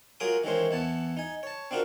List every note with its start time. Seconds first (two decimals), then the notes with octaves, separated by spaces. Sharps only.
0.20 F#3 F4 G#4 A#4 D6 D#6
0.44 D#3 E3 G#3 C#4 C5
0.71 E2 E3 B3 A5
1.17 D#4 G#5
1.43 C#5 A5
1.71 C4 D4 F4 F#4 A#4